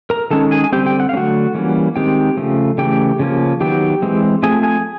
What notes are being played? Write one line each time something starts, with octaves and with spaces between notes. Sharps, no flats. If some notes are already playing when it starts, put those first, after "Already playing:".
A#4 A#5
D#3 G#3 C#4 A4 A5
G#4 G#5
G#5
D3 G3 C4 G4 G5
G4 G5
F#5
F5
D3 F#3 A3 C#4 F#4 F#5
E3 G3 A#3 C#4
D#3 G#3 C4 G4 G5
C#3 F3 A3
C#3 E3 A3 G4 G5
C#3 F3 A#3 C#4
D#3 F#3 B3 G4 G5
E3 G#3 C4
F3 A3 C4 G#4 G#5
G#4 G#5